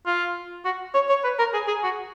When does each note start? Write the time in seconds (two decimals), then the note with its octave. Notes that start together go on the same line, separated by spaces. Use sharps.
0.06 F4
0.65 F#4
0.94 C#5
1.09 C#5
1.24 B4
1.39 A#4
1.54 G#4
1.68 G#4
1.84 F#4